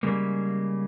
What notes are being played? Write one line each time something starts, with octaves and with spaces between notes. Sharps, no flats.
C#3 G3 G#3 A#3